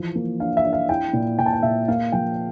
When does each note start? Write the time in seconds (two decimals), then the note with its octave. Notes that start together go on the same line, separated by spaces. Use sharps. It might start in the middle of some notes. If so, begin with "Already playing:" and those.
Already playing: E3 F3
0.15 A#3
0.40 D4 F5
0.57 E5
0.65 D4
0.73 F5
0.89 E4 G5
1.13 A#2
1.39 A#2 G5
1.46 A5
1.53 G5
1.63 A#2 E5
1.88 A#3 F5
2.12 F3 G5